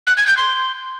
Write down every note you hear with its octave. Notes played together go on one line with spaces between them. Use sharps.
F#6
G#6
G6
C6